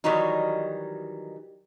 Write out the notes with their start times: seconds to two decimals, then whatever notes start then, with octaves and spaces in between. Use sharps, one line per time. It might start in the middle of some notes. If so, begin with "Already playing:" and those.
0.04 D#3 E3 F#3 G3 D#4